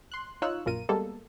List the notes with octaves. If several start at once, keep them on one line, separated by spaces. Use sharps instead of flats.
C6 F#6
D#4 F4 C#5 E6 F#6
A#1 F#2 A#2 F4 A#4 D#7
G3 G#3 A#3 B3 A4